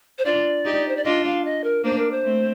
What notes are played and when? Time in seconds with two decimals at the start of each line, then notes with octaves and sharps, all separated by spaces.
0.19 C5
0.25 D4 F4 D5
0.65 D#4 G4
0.88 C5
0.97 D5
1.04 D4 F4 D#5
1.24 F5
1.45 D#5
1.64 A#4
1.84 A#3 D4 C5
1.99 A#4
2.11 C5
2.24 A3 C4